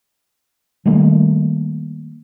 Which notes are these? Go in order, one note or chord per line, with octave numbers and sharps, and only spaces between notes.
D#3 G3 A3 A#3